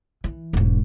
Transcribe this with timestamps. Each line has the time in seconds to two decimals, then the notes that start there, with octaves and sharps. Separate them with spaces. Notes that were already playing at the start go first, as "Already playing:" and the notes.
0.24 E3
0.53 E1 G#2